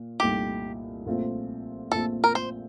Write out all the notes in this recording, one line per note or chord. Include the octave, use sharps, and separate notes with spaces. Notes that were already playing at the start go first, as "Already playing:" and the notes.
Already playing: A#2
C2 A#2 A3 D#4 G4
A#1 A#2 A3 C4 F4
A#1 A#2 A3 C4 F4 A4
A#4
C5